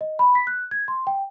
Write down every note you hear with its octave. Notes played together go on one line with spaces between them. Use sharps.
D#5
B5
B6
F#6
G#6
C6
G5